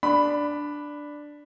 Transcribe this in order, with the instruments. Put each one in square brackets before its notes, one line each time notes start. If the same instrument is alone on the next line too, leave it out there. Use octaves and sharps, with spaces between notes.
[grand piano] D4 B5